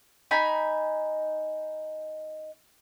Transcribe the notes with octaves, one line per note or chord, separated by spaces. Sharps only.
D#4 G#5 B5